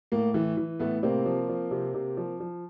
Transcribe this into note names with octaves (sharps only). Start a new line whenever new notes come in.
A2 A#3
E3 A3
E3
A2 A3 B3
C3 A#3 C4
F3
F3
C3
C3
F3
F3